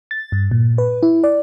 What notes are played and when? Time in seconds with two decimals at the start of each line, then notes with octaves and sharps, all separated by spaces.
0.11 A6
0.32 G2
0.51 A#2
0.78 B4
1.03 E4
1.24 D5